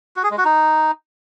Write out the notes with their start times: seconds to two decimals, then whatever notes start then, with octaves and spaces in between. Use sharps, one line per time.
0.16 F#4
0.23 G#4
0.31 G#3
0.38 F#4
0.45 D#4